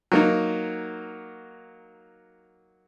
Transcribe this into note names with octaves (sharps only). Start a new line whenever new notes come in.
F#3 A#3 D#4